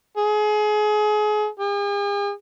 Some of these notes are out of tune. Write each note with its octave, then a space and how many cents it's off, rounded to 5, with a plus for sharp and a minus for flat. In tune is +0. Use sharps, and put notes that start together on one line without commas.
G#4 +30
G#4 -45